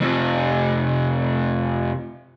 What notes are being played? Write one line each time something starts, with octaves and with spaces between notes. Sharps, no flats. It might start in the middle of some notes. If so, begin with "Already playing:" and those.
F2 C3